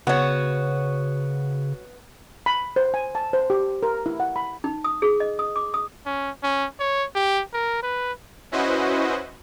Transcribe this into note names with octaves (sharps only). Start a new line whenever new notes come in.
C#3 B3 F#4 C#5
B5
C5
G#5
A5
C5
G4
A#4
E4
F#5
B5
D#4
D#6
G#4
D#5
D#6
D6
D#6
C#4
C#4
C#5
G4
A#4
B4
C#4 E4 F#4 B4 C5 D#5